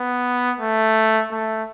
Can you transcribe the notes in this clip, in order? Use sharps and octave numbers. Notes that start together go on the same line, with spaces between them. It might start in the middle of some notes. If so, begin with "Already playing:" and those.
Already playing: B3
A3
A3